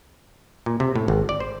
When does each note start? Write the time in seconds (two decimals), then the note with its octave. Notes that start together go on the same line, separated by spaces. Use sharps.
0.66 A#2
0.80 C3
0.96 A2
1.08 G#1
1.29 D5
1.40 C5